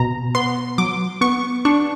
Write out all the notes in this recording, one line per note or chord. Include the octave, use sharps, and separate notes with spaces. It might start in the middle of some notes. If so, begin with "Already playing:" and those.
Already playing: B2 A#5
B3 C6
F#3 D6
B3 C#6
D4 C#6